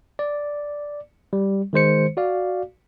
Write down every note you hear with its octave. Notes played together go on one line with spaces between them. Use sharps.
D5
G3
D#3 G#3 C5 C#7
F#4 D5 F5